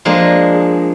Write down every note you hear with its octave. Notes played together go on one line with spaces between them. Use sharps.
F3 G#3 A#3 D4 G#4